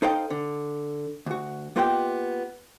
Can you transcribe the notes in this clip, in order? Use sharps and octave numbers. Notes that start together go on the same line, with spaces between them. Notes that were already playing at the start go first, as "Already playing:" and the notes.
D#4 A4 C5 D#5 F5 G5
D3
D2 F#4
A#3 B3 F4 G4 D#5 G5